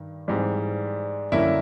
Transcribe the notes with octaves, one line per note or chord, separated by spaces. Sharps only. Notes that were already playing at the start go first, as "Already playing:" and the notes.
Already playing: G2 D#3
G#2 E3 G3 C4
F#2 D3 G3 A#3 C#4 E4 E5